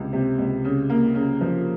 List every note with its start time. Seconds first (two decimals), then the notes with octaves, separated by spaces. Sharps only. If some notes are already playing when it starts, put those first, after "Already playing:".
Already playing: C#2 C3
0.13 C3
0.38 C#2
0.65 C#3
0.90 A#3
1.15 C#3
1.41 F3